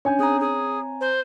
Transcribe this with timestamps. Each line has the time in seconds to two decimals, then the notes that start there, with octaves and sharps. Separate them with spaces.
0.05 C#4 D4 C#5 G#5 G6
0.19 C4 G#4 A#5
0.40 G#4
1.01 C5